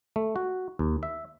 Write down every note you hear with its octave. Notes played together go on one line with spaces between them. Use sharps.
A3
F#4
D#2
E5